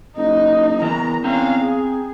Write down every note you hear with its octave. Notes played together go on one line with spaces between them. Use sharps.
F#1 D#4
E2 E3 B3 A#4 A#5
C4 C#4 F5 A#5
G#4